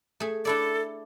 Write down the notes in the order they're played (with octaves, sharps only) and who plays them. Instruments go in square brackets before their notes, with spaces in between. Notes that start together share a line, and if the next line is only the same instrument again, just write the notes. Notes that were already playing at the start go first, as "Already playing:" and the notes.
[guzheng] A3 G#4
[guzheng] D4 E4 D5 [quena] A4